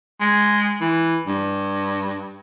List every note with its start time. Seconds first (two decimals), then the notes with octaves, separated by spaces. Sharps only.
0.20 G#3
0.81 E3
1.27 G2